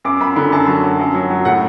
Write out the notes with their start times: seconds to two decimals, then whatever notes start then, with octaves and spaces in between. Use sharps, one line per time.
0.05 F#2 D6
0.20 F#2 B5
0.36 D3 B5
0.52 F#2 A5
0.67 F#3
0.84 F#3
0.99 F#2
1.15 F#3
1.30 F#3
1.45 A2 F#5